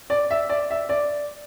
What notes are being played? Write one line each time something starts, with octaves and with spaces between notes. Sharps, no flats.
D5
E5
D5
E5
D5